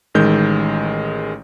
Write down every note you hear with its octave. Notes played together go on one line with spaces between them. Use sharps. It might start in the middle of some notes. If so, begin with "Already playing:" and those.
A1 D#3 G#3 G6